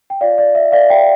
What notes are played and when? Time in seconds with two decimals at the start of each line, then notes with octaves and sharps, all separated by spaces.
0.10 G5
0.21 F4 C#5 D5 F5
0.38 D5
0.55 E5
0.72 D5 F5
0.90 E5 G5